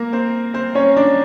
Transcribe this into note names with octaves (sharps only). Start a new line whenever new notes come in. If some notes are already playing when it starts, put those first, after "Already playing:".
Already playing: A#3 A#4
C4 C5
C4 C5
C#4 C#5
D4 D5